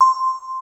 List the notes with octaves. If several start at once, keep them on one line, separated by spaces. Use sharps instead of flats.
C6